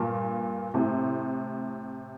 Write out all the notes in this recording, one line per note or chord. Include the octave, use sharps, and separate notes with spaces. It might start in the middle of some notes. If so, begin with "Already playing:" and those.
Already playing: G2 A#2
A2 C3